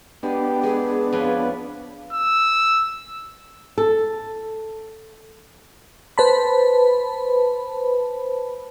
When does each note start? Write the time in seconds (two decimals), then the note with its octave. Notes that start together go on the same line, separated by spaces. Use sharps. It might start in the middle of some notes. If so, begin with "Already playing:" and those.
0.23 G#3 B3 D4 G4
0.63 G#3 G#4
1.12 F2 C#4 F4 B4
2.13 E6
3.78 A4
6.18 B4 C5 A5 B5